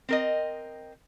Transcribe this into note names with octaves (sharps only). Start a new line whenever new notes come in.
C4 A#4 D#5